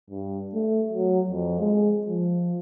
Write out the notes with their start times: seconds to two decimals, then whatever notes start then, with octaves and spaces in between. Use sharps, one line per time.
0.10 G2
0.54 A3
0.93 F#3
1.30 F2
1.60 G#3
2.07 F3